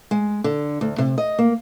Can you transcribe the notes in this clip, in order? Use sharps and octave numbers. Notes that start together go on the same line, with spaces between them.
G#3
D3
D2
C3
D#5
A#3